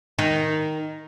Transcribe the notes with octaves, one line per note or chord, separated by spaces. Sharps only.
D#3